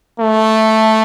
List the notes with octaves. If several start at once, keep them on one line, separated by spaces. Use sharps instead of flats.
A3